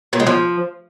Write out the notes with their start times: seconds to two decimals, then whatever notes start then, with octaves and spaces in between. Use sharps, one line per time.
0.13 A#2
0.20 G#3
0.27 F3